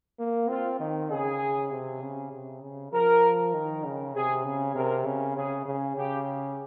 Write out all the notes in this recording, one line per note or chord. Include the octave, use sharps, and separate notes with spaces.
A#3
C4 F4
D#3
C#3 G#4
C3
C#3
C3
C#3
F3 A#4
D#3
C#3
C3 G#4
C#3
C3 A#4
C#3
C#3 G#4
C#3
C#3 G4